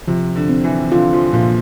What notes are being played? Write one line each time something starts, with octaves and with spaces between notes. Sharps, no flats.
C3 F3
D3
C4
E3
D3 F4
F3
A#2 F3